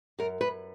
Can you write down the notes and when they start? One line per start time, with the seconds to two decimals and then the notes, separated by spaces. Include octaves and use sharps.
0.19 F#2 A#4
0.41 F#2 B4